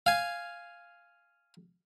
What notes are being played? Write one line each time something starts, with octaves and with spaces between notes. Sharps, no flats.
F5 G#5